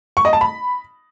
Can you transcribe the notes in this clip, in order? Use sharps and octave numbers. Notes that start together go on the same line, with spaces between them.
C#6
D#5
A5
B5